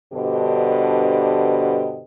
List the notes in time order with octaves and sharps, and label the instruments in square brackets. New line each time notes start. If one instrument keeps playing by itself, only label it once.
[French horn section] G2 B2 D3 G4 C5 D#5